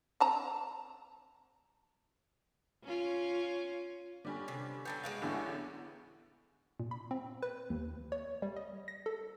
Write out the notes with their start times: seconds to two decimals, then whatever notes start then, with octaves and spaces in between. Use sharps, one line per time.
0.20 C4 A5 A#5
2.84 C#4 F4
4.25 D3 G3 C#4 D5
4.48 C3
4.85 D3 F#3 B3 G5 A5
5.03 G#3 F#4 B4 F5 D7
5.22 A1 E2 D3 C#4 E4 G4
6.80 A#2
6.91 B5
7.11 C4
7.42 B4
7.70 D#2
8.12 C#5
8.42 G3
8.56 D#5
8.88 A#6
9.06 A4